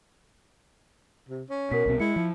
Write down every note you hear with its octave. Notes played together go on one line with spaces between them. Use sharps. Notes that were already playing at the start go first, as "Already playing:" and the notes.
C3
C#4
B2 A#4 B6
C2 B2 C4
G#3 E4 C#7
F3